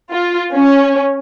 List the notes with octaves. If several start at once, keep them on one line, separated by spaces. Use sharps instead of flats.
F4
C#4